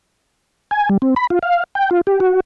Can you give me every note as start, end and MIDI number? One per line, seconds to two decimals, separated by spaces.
0.71 0.89 80
0.90 0.98 55
1.02 1.15 60
1.16 1.27 83
1.30 1.39 65
1.43 1.64 77
1.75 1.90 79
1.91 2.01 65
2.07 2.20 67
2.20 2.40 66